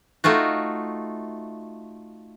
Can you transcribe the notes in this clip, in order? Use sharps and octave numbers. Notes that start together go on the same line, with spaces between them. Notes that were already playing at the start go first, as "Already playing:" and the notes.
A3 D#4 F4 F#4